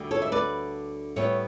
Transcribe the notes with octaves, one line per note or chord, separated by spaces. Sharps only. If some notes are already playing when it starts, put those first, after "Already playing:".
Already playing: D2 D3 G3
A4 C#5
E5
B4 D5
A2 G3 B3 C#5 E5